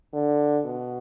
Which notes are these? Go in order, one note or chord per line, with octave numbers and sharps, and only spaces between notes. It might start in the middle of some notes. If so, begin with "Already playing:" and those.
D3
B2